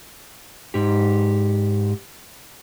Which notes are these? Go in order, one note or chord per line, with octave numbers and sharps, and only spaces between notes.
G#2 G4